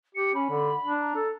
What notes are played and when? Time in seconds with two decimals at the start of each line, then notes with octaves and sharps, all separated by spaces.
0.15 G4 C#7
0.34 C#4 B5
0.50 D3
0.84 D4
1.00 A#5
1.16 A4